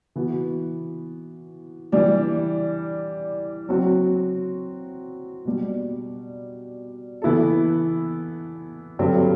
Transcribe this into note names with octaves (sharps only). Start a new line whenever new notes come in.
E3 B3 F#4
E3 G3 D4
F#3 C4 F#4
B2 G3 D4
E3 B3 E4 A4
G2 D3 F#3 C4 G4